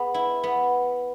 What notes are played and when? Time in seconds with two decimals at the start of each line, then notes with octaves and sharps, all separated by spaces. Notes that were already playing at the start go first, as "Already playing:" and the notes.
Already playing: B3 G#4
0.14 E4
0.43 B3